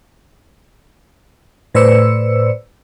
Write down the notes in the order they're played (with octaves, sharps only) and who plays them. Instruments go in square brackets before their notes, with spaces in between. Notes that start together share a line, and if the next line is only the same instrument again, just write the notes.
[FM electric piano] A2 B4 C5 D5 E6 C#7